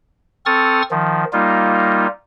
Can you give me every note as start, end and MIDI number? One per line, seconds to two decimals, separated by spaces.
0.46 0.82 60
0.46 0.82 69
0.46 0.82 85
0.46 0.82 87
0.46 0.82 89
0.46 0.82 93
0.91 1.25 51
0.91 1.25 53
1.33 2.07 55
1.33 2.07 58
1.33 2.07 63
1.33 2.07 65